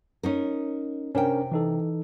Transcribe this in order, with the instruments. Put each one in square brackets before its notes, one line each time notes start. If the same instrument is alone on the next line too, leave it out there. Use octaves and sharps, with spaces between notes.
[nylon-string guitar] C#4 D#4 A#4
[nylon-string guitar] C3 G5 [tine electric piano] C#4 D4 A#4
[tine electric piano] E3 D#4 A4